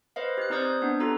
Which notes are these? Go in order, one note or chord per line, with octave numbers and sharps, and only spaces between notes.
B4 C5 D#5 F5
G4 F#6
C4 D#4 C5 D5 D#6 G6
B3 D4 D#4
F4 G4 A4 A#5